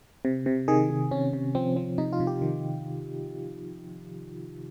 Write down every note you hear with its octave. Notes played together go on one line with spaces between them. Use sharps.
C3
C3
D#3 G#4
D#3
C3 C#4
C3
F3 C4
F3 C4
C3 D#4
F4
C3
G4
D#3